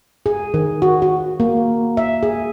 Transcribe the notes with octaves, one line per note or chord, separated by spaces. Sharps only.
G#4
D#3
F#4
F#4
A#3
E5
G#4